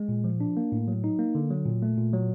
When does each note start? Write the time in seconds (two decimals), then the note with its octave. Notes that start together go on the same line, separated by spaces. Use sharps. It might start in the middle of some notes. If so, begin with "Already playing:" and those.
Already playing: G#3
0.09 A#2
0.24 F3
0.40 D4
0.57 A#3
0.72 A2
0.88 F#3
1.04 D#4
1.19 A#3
1.35 D3
1.51 F#3
1.66 A#2
1.82 A3
1.98 A#2
2.13 F#3